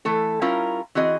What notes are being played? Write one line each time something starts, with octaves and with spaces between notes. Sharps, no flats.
E3 A3 A4
G3 C#4 E4 F4 A#4
E3 C4 F#4 G#4 D#5